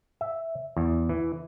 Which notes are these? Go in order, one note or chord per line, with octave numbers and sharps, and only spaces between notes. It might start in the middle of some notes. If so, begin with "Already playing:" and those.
E5
E2
E3